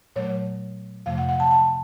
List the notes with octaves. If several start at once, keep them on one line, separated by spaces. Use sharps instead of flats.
A#2 F#3 A3 C#5
F2 C3 F3 A3 F5
F#5
F#5
A5
A5